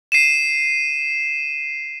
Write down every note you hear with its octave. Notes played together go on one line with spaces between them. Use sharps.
C7 D#7 E7